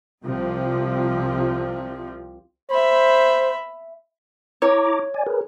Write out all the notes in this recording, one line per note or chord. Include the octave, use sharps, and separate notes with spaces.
C2 C3 F3
C5 E5 B5
E4 C#5 A#5 D6
D5 G#5
G#4 A#4 B4